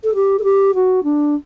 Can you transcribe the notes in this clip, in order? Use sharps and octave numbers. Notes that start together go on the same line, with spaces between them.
A4
G4
A4
G4
F#4
D4